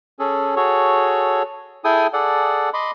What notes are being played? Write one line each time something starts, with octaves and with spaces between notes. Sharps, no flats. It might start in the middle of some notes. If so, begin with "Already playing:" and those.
C#4 G#4 A4
F#4 G#4 A4 C#5
E4 G#4 A4 G5 G#5 D#6
G#4 A4 D5 F#5
D#5 B5 C6 D6